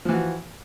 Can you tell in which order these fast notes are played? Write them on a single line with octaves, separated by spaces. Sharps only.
F3 E3 F#4